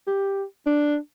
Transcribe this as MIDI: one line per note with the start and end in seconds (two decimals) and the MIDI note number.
0.08 0.43 67
0.66 0.97 62